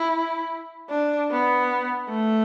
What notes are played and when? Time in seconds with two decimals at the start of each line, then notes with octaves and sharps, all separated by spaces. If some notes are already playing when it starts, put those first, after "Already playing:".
Already playing: E4
0.89 D4
1.30 B3
2.09 A3